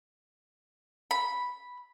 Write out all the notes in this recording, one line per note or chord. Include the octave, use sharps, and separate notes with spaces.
B5